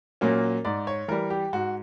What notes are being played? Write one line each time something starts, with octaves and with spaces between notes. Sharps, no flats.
A#2 F#3 A#3 C#4
G#2 D5
C#5
E3 G3 A#4
G4
G#2 F#4